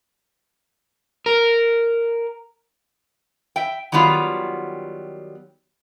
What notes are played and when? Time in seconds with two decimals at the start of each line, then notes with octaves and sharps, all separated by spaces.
1.26 A#4
3.56 E5 G5
3.92 D#3 F#3 G3 B3 F4